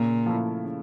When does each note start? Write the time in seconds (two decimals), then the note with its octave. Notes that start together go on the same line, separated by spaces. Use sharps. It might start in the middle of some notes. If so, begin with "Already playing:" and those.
Already playing: A#2 C#3
0.26 F3 A3 E4
0.64 C#3